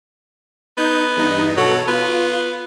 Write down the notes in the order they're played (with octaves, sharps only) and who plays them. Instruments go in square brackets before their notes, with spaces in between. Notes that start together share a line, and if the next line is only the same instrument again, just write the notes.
[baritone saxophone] B3 [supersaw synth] D#4 G6
[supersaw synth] E2 G2 D#4
[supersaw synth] B2 A4 [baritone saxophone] F#3
[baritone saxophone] B3 [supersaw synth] F4